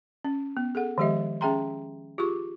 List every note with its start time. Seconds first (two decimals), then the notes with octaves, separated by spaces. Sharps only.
0.24 C#4
0.57 B3
0.75 G#4 A4 F#5
0.98 D#3 F3 G#3 G4 D#5 E5
1.41 C#4 G#4 E5 G5 A#5 C6
2.18 F4 G4 G#4 C#6 D6